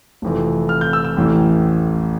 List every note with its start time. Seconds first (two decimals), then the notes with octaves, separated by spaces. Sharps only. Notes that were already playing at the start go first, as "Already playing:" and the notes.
0.22 F1 F2 E3
0.69 F6
0.81 G6
0.93 E6
1.05 E6
1.17 A1 A2 E3